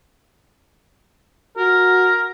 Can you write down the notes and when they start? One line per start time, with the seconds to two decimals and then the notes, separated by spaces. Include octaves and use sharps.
1.58 F#4 A#4